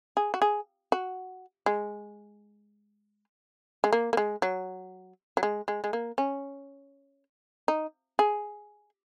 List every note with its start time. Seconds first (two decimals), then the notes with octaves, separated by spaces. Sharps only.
0.17 G#4
0.34 F#4
0.42 G#4
0.92 F#4
1.66 G#3
3.84 G#3
3.93 A#3
4.13 A#3
4.17 G#3
4.42 F#3
5.37 F#3
5.43 G#3
5.68 G#3
5.84 G#3
5.93 A#3
6.18 C#4
7.68 D#4
8.19 G#4